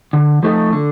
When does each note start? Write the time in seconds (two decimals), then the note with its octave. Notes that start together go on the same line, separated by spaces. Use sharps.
0.13 D3
0.43 F3 A3 D#4 A4
0.73 D3